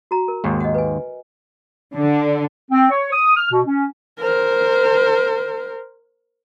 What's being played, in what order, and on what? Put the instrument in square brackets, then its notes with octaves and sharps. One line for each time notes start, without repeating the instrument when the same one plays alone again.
[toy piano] F#4 A#5
A#4
[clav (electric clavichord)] D#2 G#2
[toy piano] D#5 F#5
B4 G#5
[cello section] D3
[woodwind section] C4
C#5
D#6
F6
B2
C#4
[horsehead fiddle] A#4 C5